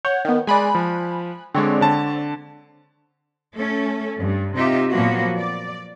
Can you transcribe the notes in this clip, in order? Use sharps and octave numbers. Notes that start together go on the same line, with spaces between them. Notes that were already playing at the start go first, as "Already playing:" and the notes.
C#5 F#5 G6
D#3 B3
G#3 D5 G#5 B5 F#6
F3
D3 G#3 C4 C#5 D5
D3 A5
A3 C#4 A4
G2
C3 D#4 F4 G4 E5
A#2 F3 F#3 A#3 B3 F#4
D5